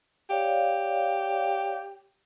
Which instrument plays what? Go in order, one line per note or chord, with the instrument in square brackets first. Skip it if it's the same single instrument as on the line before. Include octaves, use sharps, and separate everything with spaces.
[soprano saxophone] G4 [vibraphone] C#5 D5 F5